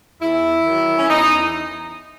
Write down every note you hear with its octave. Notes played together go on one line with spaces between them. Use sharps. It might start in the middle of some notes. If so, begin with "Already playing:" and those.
E2 E4
D#3 F#3
C#4
E2 D#4